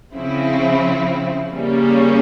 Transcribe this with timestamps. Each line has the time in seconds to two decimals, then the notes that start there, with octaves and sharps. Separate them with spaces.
0.13 C#3 F3 C4 E4
1.54 C#3 G3 A#3 C#4